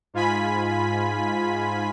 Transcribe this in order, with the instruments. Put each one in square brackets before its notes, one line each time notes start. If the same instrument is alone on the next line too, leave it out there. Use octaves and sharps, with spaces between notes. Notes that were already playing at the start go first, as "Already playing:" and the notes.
[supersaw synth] G#2 F4 G#5 B5 B6